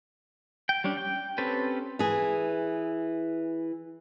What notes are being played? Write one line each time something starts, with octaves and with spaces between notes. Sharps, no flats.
G5
G3 C#4 D4
G5
C4 C#4 G4 A4 B4
E3 G#4